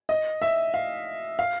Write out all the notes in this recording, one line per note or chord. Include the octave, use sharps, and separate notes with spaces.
D#5
E5
F5
F5